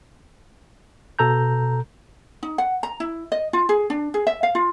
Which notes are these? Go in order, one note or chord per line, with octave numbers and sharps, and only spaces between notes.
B2 A4 A#5 G6
D#4
F#5
A#5
E4
D#5
F4
G#4
D4
G#4
E5
F5
F4